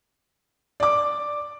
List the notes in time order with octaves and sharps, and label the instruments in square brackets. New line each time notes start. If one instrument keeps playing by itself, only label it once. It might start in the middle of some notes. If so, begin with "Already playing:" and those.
[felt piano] D5 D6